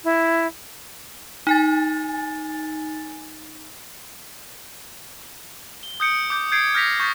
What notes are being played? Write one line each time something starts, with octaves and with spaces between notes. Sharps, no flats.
E4
D#4 G#5 A6
G7
D#6 G6 C#7 D7
D6 G6
G6 G#6 C7 D7
F6 G6 A#6 B6 F7
C#6 G6 A6 B6